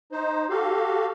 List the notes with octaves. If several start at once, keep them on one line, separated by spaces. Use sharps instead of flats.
D#4 C5
F#4 G4 A4 F5